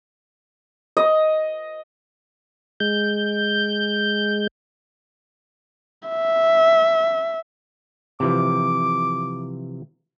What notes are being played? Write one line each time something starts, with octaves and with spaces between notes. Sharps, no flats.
D#5
G#3 G6
E5
C3 E3 F3 D6